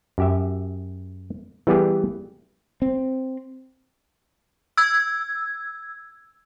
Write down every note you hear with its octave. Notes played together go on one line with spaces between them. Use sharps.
F#2 G4 E5
E3 G3 B3 G4 G#4
C4
E6 G#6